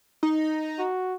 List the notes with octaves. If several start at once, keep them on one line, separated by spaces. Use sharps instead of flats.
D#4
F#4